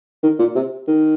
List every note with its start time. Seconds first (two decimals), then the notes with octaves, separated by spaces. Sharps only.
0.23 D#3
0.39 A#2
0.55 C3
0.88 D#3